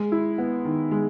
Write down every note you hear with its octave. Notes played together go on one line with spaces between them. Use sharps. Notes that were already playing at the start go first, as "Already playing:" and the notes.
Already playing: G#3
E4
B3
D#3
G#3